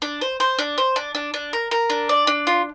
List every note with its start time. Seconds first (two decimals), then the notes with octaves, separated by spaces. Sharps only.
0.02 D4
0.21 C5
0.40 C5
0.59 D4
0.78 C5
0.96 D4
1.15 D4
1.34 D4
1.53 A#4
1.71 A#4
1.90 D4
2.09 D5
2.27 D4
2.47 F4